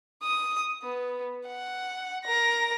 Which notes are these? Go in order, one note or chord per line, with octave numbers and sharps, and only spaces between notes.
D#6
B3
F#5
A#4 A#6